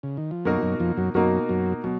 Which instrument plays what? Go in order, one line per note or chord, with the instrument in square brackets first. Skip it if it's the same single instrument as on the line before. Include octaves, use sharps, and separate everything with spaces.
[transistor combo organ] C#3
D#3
F3
[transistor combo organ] F#2 F#3 [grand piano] B2 A#3 D#4 F#4 A#4
[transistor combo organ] F#2 F#3
F2 F3
F#2 F#3
[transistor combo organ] F#2 F#3 [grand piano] B2 A#3 D#4 F#4 A#4
[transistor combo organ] F#2 F#3
[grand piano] B2 [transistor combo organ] F#3